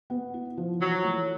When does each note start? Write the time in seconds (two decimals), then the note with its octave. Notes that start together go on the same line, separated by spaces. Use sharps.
0.10 B3
0.34 E4
0.57 F3
0.80 E3 F#3
1.03 A3